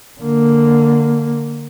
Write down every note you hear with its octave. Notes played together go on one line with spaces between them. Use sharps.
D3 A#3